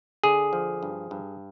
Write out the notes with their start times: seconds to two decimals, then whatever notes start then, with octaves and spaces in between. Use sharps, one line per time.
0.24 D3 G#4
0.53 F3
0.83 G2
1.11 G2